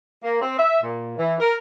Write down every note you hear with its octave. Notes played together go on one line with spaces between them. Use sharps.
A#3
C4
E5
A#2
E3
A#4